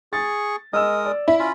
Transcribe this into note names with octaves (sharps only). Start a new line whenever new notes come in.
G#4 C#6 A6
G#3 A#4 D#5 D#6 E6
D5
E4 B5
C#4 F4 B5